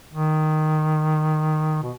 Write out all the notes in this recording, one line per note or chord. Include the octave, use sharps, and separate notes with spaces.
D#3
B2